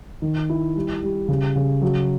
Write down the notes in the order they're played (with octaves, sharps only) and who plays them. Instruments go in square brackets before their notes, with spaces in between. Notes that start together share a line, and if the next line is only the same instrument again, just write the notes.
[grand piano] D#3
E4
G3
G3
C#3
C#3
F#3